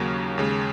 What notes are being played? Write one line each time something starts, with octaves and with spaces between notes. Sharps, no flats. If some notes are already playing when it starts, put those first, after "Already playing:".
Already playing: D#2 C#3 F#3 A#3 C#4
D#2 C#3 G#3